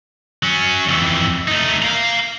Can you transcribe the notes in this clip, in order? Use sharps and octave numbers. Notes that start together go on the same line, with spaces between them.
F#3 C#4
F2 E3
A3 D#4
F5 A#5